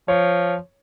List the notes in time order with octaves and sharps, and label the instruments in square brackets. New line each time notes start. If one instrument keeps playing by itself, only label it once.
[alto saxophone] F3 [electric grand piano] C#5